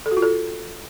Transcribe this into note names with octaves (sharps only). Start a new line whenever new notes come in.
A4
F#4
F4
A4